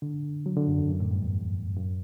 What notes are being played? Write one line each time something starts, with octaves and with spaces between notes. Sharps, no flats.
D3
F#3
D3
F#2
E2
F#2
A2
G2
E2
F#2